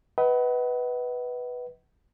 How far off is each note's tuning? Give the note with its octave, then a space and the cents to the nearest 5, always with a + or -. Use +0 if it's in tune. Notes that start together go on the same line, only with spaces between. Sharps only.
B4 +0 D#5 +40 F#5 +25